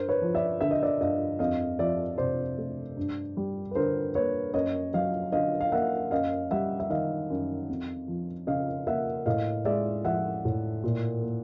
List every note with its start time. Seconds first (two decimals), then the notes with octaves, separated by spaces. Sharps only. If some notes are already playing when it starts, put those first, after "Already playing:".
Already playing: G2 A#4 C5
0.09 B4 C#5
0.22 F3
0.34 D5 E5
0.61 D3 E5
0.71 D#5
0.83 D5 E5
1.00 G2 D#5 F5
1.39 F2 D#5 F5
1.79 F3 D5 E5
2.18 C3 C5 D5
2.58 A3
2.97 G2
3.37 G3
3.71 B4
3.75 D3 A#4 C5
4.15 A#3 B4 C#5
4.54 F#2 C#5 D#5
4.94 F#3 D#5 F5
5.32 D3 D#5 F5
5.61 F5
5.72 A#3 E5 F#5
6.11 F#2 D#5 F5
6.51 G3 E5 F#5
6.80 E5
6.90 D#3 D#5 F5
7.30 F#2
7.69 F2
8.08 F3
8.47 C#3 D#5 F5
8.87 A#3 E5 F#5
9.26 A2 D#5 F5
9.65 G#3 D5 E5
10.05 F3 E5 F#5
10.45 A2
10.84 A#2
11.23 A#3